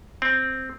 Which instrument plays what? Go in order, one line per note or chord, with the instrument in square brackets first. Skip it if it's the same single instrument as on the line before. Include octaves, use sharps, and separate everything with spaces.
[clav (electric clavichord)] C4